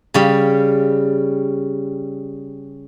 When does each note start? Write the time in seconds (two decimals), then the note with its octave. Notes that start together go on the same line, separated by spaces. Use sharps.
0.14 C#3 G3